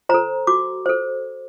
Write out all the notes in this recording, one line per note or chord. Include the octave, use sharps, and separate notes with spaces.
A4 C5 A#5
F#4 D6
A4 C5